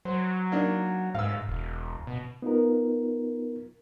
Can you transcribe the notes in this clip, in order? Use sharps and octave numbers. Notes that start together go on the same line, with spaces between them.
F#3 C5
A#3 D4 D#4
G#2 F5 E6
E1
B2
B3 D#4 F4 A#4